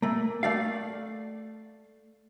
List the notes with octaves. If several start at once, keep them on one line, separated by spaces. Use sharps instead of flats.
A3 A#3
A3 D5 F5